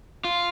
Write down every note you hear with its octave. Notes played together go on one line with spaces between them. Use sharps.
F4